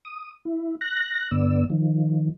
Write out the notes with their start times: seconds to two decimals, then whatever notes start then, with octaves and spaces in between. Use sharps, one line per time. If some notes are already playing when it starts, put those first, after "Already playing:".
0.05 D#6
0.45 E4
0.81 F#6 A#6
1.31 G2 D3 B3 D5 E6
1.70 D#3 F3